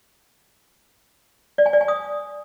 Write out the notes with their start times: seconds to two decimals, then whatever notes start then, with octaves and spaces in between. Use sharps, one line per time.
1.58 D5
1.66 G#5
1.73 D5
1.81 G#5
1.88 D#6